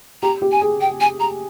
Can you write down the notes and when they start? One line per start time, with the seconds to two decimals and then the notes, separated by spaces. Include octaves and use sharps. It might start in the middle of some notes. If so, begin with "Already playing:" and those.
0.23 G4 A#5
0.42 G4
0.52 G#5
0.61 G#4
0.81 G5
1.01 G#5
1.20 A#5